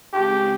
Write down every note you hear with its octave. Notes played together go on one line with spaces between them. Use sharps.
C#3 G#3 C4 G4